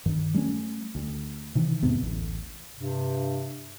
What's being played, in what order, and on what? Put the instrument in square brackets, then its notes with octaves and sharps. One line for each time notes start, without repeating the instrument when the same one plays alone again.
[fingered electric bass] G2 D#3
G3 A3 B3 C#4
D2
C3 D#3 E3
E2 G#2 C3 B3
D1 A1
[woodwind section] G2 C3